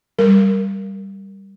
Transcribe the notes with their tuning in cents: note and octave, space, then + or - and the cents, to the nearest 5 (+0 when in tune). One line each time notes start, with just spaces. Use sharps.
G3 +0 A#4 +0